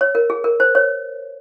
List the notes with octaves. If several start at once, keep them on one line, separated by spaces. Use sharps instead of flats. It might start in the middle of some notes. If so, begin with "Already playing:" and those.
C#5
A#4
G#4
A#4
C5
C#5